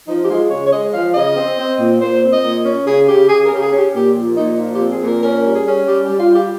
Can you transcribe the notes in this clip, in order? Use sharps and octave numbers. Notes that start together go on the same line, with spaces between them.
F3 D#4
G4
G#3 F4
C#3 C#5
C#5
G#3 D#5
F3 F5
C#3 D#5
C4
C4
A#2
A#2 C5
C4
D#5
A#2
C#4
C#3 G#4
C#3 G4
C#3 G#4
A#4
C#3 G4
G#4
C#4
G4
A#2 G4
F3
A#2 D#4
F3 F4
G4
C4
G#4
A#2 A#4
C#4 A#4
G3
G#4
C#4
G3 G4
G4
G3
F4
G3
G4